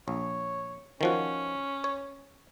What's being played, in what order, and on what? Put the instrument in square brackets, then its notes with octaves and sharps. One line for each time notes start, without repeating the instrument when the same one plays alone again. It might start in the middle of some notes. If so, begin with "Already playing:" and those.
[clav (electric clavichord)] A#1 [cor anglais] C#5
[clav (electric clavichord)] D#3 F3 F#4 [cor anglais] C#4
[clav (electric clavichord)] C#5